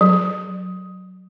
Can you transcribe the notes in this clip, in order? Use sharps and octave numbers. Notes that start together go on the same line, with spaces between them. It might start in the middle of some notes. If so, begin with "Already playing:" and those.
F#3